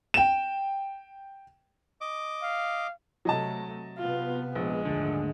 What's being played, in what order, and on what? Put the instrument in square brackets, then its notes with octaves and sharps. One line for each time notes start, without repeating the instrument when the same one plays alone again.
[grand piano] G5 E7
[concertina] D#5 D6
[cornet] F5
[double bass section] C3 A3 [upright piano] F#3 D#5 A5
[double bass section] C3 B3 [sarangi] F4
[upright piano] A#1 [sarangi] G#3
[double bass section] D#2 G#2 A3 [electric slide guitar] D3